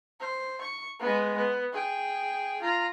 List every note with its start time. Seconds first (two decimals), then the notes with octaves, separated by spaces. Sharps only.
0.20 C5
0.61 C#6
1.00 G#3 B3
1.37 B3
1.72 G#4 G5
2.61 F4 A#5